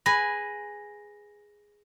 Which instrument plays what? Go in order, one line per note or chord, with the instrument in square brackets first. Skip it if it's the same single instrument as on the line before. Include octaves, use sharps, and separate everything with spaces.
[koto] G#4 B4 G#5 [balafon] B5 [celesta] A#6